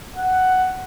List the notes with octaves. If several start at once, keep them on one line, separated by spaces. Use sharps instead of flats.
F#5